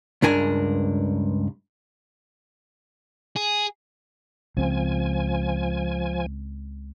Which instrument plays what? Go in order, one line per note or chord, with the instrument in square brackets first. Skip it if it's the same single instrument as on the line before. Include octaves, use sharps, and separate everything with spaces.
[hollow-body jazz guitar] C#2 G2 D4 A#4 G#5
[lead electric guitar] G#4
[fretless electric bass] C#2 C4 [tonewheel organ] F3 G#5